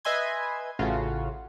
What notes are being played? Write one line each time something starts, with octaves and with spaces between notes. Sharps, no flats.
B4 D#5 E5 G#5 C6 G#6
A1 A2 C#3 F4 F#4